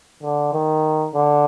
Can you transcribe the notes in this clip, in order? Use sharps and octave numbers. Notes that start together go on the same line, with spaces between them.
D3
D#3
D3